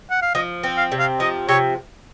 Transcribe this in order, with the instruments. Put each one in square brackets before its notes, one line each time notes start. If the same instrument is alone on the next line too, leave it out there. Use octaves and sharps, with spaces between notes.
[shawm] F#5
F5
[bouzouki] F3 [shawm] D#5
[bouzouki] C4
[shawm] F5
[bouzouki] C3
[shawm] F5
[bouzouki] F3 [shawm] D#5
[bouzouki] C3 [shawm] C#5